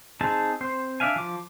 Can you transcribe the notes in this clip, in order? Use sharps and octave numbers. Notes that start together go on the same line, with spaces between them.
C4 D#4 G#4 A5
C4 C5
D4 D5 E5 F5 G#5
F3 D6